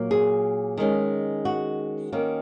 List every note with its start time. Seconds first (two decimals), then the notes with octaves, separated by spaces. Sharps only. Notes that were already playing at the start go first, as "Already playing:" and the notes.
Already playing: A#2 F#3 A#3
0.11 G#4
0.78 D#3 G#3 C#4
1.45 F#4
2.12 D#3 A#3 C#4